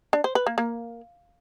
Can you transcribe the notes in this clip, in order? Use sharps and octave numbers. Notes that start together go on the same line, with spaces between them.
D4
C5
B4
A#3
A#3